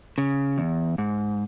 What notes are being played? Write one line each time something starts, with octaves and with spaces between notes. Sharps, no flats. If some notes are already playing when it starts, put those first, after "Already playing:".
C#3
E2
G#2